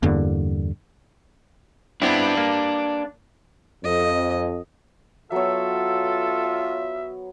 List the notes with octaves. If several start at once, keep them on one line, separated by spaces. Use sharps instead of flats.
E2 G2 D3 A#3
B3 C4 D4 E4 B4
A#3
F2 D#5
F#3 B3 F4 A4 C#5 E5